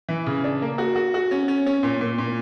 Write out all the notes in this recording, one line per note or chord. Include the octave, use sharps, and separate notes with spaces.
E3
C#3
D4
A#3
F#4
F#4
F#4
C#4
C#4
C#4
A#2
A#2
A#2